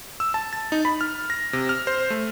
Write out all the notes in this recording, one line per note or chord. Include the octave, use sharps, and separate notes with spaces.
E6
A5
A6
D#4
B5
F6
A#6
C3
F6
C5
A3